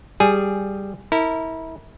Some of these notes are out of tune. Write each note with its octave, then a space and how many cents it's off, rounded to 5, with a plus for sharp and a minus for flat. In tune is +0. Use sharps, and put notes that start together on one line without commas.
G3 +0 G#4 -5 G#5 +0
E4 -30 A#4 -30